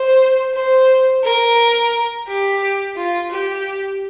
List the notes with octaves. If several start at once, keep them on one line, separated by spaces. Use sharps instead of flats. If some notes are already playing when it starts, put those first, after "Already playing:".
Already playing: C5
C5
A#4
G4
F4
G4